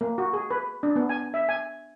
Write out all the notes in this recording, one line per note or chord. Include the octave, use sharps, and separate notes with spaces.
A#3
F#4
G#4
B4
D4
B3
G#5
E5
G#5